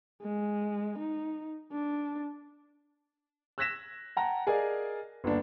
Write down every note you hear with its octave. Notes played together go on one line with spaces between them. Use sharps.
G#3
D#4
D4
E6 F#6 G#6 A#6 B6 E7
F#5 G5 A5 A#5 A#6
G#4 A#4 D5 D#5 F5 G#5
G1 D#2 D4